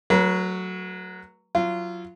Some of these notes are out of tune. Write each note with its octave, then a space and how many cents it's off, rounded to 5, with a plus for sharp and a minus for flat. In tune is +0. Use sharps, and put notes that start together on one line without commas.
F#3 +0 A3 +10 B4 -40
F#3 -15 F4 -25